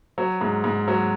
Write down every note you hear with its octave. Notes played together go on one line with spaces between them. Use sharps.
F#3
G#2
G#2
F#3